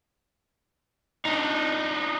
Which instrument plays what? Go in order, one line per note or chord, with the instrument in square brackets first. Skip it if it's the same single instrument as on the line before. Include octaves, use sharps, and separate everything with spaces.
[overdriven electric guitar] D4 D#4